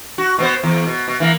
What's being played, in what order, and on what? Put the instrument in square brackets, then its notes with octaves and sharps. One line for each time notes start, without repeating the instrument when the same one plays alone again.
[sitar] F#4
B2 B3 C5
E2
B2
B2
E3 A#3